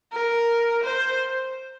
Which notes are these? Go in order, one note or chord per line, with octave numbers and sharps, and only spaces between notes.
A#4
C5